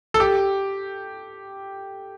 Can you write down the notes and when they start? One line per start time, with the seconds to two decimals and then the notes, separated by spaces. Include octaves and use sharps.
0.14 A4
0.20 G4